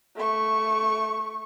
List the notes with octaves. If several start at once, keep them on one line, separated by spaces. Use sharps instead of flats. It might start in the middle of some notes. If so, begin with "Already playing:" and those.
A3 C#6